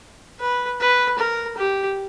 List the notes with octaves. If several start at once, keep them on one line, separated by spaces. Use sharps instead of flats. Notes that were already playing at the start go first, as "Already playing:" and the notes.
B4
B4
A#4
G4